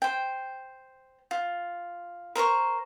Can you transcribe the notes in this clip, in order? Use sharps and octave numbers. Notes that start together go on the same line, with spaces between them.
C5 G5
F4
A#4 C5 A#5 C#6